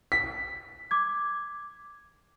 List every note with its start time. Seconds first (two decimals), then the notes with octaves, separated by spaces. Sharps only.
0.12 B6
0.91 D6 G#6